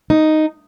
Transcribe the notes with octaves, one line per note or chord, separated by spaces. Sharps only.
D#4